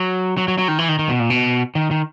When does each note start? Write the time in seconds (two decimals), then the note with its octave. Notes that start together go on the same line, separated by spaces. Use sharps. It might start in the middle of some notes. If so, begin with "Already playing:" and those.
Already playing: F#3
0.38 F#3
0.48 F#3
0.58 F#3
0.68 D#3
0.78 E3
0.89 D#3
0.99 D#3
1.09 B2
1.20 A#2
1.30 B2
1.75 D#3
1.91 D#3